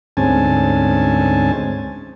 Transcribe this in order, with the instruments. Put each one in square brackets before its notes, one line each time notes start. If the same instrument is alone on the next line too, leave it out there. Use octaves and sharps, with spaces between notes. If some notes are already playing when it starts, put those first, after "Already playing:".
[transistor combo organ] D2 G#2 C4 C#4 G#5 A5